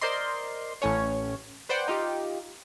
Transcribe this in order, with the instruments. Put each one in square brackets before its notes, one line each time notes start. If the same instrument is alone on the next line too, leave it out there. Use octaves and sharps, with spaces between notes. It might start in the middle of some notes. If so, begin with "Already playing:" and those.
[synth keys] A#4 C5 D5 D#5 C6
A1 A2 C#4 C#5
B4 C5 D5 F#5 G5
D#4 F4 G4